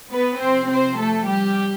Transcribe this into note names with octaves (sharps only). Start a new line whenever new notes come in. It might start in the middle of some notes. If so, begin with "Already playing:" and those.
B3 B4
C3 F3 C4 C5
C4 C5
A3 A4
G3 G4